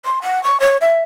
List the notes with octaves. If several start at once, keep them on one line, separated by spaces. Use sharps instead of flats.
C6
F#5
C#6
C#5
E5